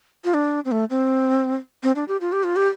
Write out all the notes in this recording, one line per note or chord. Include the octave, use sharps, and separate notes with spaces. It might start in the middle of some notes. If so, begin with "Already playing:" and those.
F4
D4
C4
A3
C4
C4
D4
G4
F4
G4
F4
G4